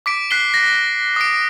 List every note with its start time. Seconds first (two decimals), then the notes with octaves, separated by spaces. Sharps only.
0.06 D6 B6 D7
0.31 F#6 B6 C7 G7
0.54 A#6
1.16 D#6 D7